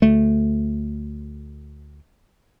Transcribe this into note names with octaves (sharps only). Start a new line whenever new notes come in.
D2 A3